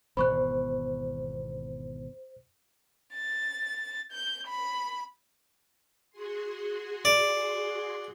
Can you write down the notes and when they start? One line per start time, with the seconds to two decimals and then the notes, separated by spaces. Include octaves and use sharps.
0.17 G#1 E2 B2 C5 B5 C#6 F#6
3.14 A6
4.12 G6
4.47 B5
6.10 F#4 G#4 C6
7.05 D5